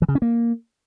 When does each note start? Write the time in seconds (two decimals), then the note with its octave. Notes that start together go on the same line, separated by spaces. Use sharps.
0.02 E3
0.08 C#3
0.15 C#4
0.22 A#3